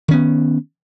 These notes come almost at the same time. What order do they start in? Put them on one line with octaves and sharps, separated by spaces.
D#3 C#4 B3